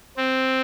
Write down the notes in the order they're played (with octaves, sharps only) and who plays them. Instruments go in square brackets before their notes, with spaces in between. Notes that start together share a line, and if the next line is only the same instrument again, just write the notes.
[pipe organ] C4